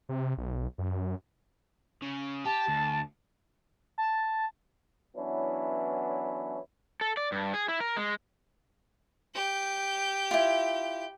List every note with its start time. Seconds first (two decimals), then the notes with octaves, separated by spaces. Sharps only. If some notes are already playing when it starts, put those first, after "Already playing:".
0.09 C3
0.38 B1
0.78 F#2
2.02 C#3
2.45 G4 A5
2.68 D2
3.98 A5
5.16 E3 F#3 B3 C#4 D4 E4
7.01 A4
7.17 D5
7.32 G2
7.54 G#4
7.68 E4
7.80 A#4
7.97 G#3
9.35 G4 G6
10.31 E4 F4